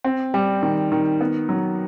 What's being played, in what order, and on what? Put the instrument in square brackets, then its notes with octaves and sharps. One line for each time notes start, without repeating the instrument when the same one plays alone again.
[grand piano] C4
G3
D#3
D#3
B3
F#3